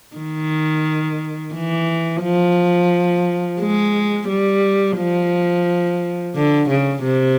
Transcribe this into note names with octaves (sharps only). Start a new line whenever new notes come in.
D#3
E3
F3
G#3
G3
F3
D3
C#3
C3